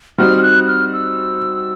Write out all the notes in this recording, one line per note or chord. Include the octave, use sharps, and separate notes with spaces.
G3 C4 D#4 F#4 F6
F6
F#6
F6
E6